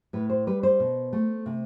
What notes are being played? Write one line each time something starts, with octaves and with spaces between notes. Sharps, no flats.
A2 B4
C5
G3 B4
C5
B2
A3
C3